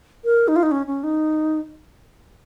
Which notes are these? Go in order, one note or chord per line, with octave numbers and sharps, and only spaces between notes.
A#4
D#4
F4
D#4
C#4
C#4
D#4